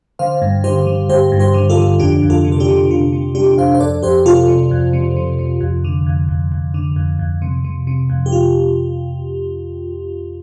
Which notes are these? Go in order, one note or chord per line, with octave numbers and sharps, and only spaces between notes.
D3 C5 F5
G2
D3 G4 C5
D3
G2 G4 C5
G2
G4 C5
D3
F4 A4
D3
F2 D4 G4
F2
F4 A4
C3
A4
D4 G4
C3
C3 F4
C3
C3 D4 G4
F2 C5 F5
C5
F2 A4 D5
F2 G4 C5
C3 F4 A4
C3
F2
C3
C3
C3
F2
D3
F2
F2
F2
D3
F2
F2
C3
C3
C3
F2
G4
F4